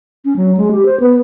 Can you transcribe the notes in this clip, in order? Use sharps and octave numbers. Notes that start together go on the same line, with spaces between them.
C#4
F#3
G#3
G4
C5
B3